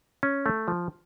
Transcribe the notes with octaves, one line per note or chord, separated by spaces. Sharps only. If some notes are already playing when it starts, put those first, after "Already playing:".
C#4
A3
F3